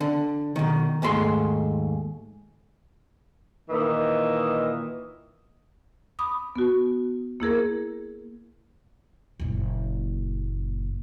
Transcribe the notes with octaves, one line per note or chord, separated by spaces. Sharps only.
D3
B2 D#3
D#2 G#2 A3 B5 C6
A#2 D#3 E3 A#3 D#5
B5 D6 D#6
B3 F#4
A#3 E4 G#4 A#4
F#1 A#2